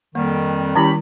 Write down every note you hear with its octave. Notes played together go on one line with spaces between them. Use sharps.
F2 D#3 G3 A#3
D#3 G3 C#4 E4 G4 B5